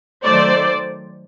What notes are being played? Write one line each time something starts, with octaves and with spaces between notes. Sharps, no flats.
D#3 F#3 A3 C5 D5